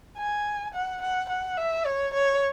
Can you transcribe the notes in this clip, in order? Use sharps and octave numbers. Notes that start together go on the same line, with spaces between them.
G#5
F#5
F#5
F#5
E5
C#5
C#5